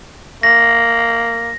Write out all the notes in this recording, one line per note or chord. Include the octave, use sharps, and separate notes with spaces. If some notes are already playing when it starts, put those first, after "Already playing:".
A#3 A#6